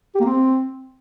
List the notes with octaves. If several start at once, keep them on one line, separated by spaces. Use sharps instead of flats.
G4
A#3
C4